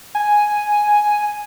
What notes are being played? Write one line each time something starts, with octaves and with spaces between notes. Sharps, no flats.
G#5